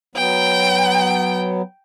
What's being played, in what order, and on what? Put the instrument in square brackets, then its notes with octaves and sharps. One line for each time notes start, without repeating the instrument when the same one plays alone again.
[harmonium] F#3 B3 [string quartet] G5